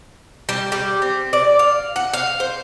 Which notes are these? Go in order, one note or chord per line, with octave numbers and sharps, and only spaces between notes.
G3
G3
C4
D5
F5
F#5
F5
C5